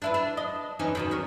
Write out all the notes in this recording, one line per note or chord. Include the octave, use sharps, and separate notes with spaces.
D4 E4 B4
D4
D#5
E3 C#4 D#4
E2 B2 D#3
C#4 A#4